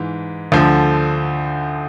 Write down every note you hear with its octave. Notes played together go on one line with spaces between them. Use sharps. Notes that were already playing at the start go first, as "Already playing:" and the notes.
Already playing: G#2 E3
D2 D3 F3